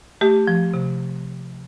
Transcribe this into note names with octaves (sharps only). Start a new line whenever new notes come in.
A3 G4
F3
C3